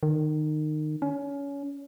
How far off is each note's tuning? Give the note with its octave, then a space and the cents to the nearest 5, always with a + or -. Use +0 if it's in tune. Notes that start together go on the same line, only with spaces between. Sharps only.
D#3 -25
C#4 +25